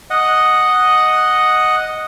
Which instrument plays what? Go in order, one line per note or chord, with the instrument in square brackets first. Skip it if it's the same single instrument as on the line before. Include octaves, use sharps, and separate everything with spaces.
[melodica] D#5 F#5